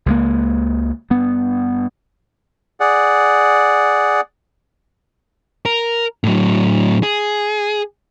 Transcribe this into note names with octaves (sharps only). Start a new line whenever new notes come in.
C#2 G#3 A#3
G2 B3
G#4 D5 F#5
A#4
A2 F#3
G#4